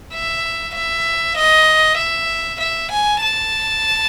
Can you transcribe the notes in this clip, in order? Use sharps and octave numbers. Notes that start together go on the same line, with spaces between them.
E5
E5
D#5
E5
E5
G#5
A5